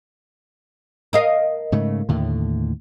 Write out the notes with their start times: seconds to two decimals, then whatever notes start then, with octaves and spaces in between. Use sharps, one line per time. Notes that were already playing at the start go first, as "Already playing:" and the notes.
1.13 A#4 D#5 F5
1.72 G#2 C#3 A3
2.09 D#2 A2 D3